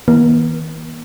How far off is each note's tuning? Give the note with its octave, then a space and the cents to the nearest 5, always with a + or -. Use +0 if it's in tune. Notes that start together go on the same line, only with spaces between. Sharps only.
D#3 +45 A#3 +35